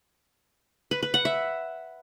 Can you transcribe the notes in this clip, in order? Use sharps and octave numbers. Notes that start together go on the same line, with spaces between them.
B4
B4
F#5
E5